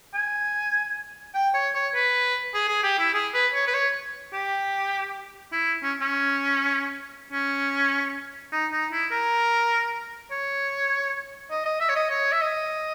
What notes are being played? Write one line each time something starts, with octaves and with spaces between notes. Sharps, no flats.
G#5
G5
C#5
C#5
B4
G#4
G#4
G4
E4
G#4
B4
C#5
B4
C#5
G4
E4
C#4
C#4
C#4
D#4
D#4
E4
A#4
C#5
D#5
D#5
E5
C#5
D#5
C#5
E5
D#5